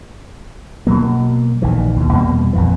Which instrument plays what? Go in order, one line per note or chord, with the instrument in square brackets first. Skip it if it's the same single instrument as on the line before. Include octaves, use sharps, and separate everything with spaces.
[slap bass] B2 F#3 A#3
A#1 D#3 E3
D#2 B2
E2 B2 G3 A#3
A#1 F2 E3